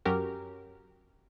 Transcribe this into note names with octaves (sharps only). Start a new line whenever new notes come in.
F#2 F#3 C#4 G4 A#4